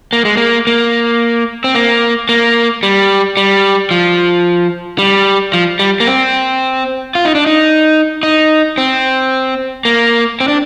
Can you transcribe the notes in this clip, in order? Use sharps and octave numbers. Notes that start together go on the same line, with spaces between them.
A#3
G#3
A#3
A#3
C4
A#3
A#3
G3
G3
F3
G3
F3
G3
A#3
C4
F4
D#4
D4
D#4
D#4
C4
A#3
C4
D4